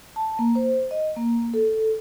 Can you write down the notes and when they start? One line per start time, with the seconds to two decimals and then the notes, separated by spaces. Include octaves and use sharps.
0.16 A5
0.39 A#3
0.55 C5
0.91 D#5
1.16 A#3
1.54 A4